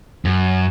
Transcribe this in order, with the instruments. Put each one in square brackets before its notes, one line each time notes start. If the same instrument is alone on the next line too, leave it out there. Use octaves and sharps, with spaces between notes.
[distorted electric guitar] F#2